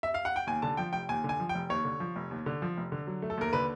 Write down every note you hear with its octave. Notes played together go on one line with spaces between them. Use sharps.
E5
F5
F#5
G5
D#2 G#5
D3 A5
F3 G5
F1 G5
D#2 G#5
D3
G#5
F3
G5
F1
D#2 C#5
D3
F3
F1
D#2
D3
F3
F1
D3
F#3
A3
A4
D#2 A#4
D3 B4